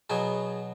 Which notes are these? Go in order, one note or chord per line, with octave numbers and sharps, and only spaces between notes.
B2 F#3 B3 G#4